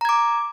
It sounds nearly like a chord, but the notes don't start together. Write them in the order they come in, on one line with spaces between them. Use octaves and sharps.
A#5 G#6 D6